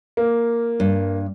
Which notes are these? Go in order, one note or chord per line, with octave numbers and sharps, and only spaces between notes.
A#3
G2